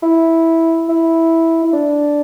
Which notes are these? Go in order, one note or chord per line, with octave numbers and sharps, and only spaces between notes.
E4
E4
E4
D4